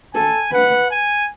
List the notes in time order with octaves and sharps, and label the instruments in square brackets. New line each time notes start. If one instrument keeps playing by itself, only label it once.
[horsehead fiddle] A4 [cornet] G#5
[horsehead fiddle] B4 [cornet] F#5
[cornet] G#5